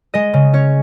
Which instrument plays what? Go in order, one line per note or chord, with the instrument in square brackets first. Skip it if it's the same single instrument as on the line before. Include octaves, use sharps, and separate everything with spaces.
[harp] G#3 D#5
C#3
C#4 C#5